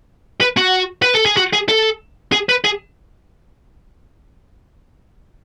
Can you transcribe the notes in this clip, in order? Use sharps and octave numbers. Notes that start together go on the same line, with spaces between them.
B4
F#4
B4
A4
G#4
F#4
G#4
A4
G#4
B4
G#4